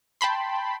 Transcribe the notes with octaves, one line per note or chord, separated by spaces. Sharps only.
G5 A5 B5 C6